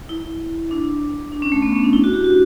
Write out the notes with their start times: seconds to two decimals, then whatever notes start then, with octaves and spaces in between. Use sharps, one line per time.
0.09 E4
0.71 D4
1.32 D4
1.42 C#4
1.52 A3
1.62 B3
1.72 C#4
1.84 D4
1.93 E4
2.04 F#4
2.14 G4
2.24 F#4